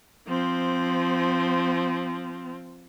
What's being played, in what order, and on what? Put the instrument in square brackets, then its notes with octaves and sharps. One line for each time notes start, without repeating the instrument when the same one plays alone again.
[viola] F3 C4